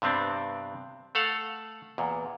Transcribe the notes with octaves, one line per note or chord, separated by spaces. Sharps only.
G2 C3 B3 C4 D4
A3 A4 F5 F#5
E2 A#2